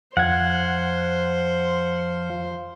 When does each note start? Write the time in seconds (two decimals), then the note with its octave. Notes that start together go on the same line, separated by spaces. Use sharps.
0.17 F2 F3 C5 F#5 G#6